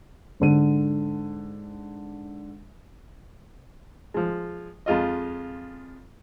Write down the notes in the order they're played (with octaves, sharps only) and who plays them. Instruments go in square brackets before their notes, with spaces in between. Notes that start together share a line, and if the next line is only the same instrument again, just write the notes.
[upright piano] G#2 D3 D#7
[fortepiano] F3 G#3
F2 G#3 F4 D#5